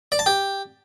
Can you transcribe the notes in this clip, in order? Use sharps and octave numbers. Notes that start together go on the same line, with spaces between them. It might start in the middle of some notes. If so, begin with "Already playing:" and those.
D5
A5
G4